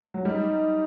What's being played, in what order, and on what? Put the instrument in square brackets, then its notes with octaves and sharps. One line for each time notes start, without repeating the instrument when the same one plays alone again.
[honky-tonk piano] F#3
[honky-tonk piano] G3 [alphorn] D#4